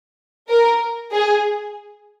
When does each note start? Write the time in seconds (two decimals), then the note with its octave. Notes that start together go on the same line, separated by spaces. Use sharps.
0.49 A#4
1.12 G#4